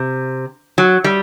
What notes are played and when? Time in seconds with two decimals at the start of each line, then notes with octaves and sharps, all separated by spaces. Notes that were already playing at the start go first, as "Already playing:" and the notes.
Already playing: C3
0.78 F#3
1.04 G3